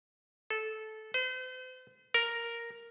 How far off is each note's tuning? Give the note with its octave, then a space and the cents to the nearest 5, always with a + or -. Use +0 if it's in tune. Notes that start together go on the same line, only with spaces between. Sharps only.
A4 -15
C5 -40
A#4 +0